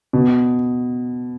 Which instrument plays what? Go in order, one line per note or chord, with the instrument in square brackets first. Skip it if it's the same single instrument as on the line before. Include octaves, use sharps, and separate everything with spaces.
[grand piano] B2